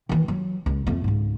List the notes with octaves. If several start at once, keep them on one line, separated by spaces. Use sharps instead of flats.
D#3 E3
F#3
C#2
F2 A3
C#2 G#2